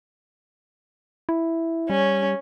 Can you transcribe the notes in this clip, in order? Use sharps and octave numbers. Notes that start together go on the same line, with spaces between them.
E4
G3 C#4